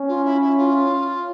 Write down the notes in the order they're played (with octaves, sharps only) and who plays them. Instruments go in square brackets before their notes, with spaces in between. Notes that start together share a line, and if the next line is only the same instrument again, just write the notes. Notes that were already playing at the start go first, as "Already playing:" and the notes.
Already playing: [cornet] C#4
[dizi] F4
E4
E4
F4